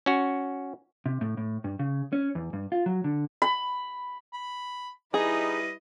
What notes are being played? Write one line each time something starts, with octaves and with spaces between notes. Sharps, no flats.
C#4 F#4
C3
A2
A2
G2
C#3
C#4
E2
G2
F4
F#3
D3
B5
B5
G3 D#4 E4 G#4 B4 D#5